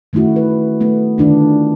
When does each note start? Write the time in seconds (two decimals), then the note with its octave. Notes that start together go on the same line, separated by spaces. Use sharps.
0.13 D#3 A3 C#4 E4 F#4
0.36 B4
0.80 A3 B3
1.18 D3 D#3 D4 F4